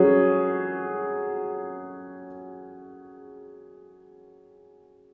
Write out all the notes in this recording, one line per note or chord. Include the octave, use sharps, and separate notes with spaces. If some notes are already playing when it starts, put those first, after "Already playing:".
Already playing: F#3 C#4 G#4